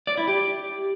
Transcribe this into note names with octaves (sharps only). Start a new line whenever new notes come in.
D5
E4
G4